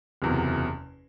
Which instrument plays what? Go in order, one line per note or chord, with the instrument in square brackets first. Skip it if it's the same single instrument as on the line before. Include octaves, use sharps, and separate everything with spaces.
[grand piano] F#1 E2 C3 F#3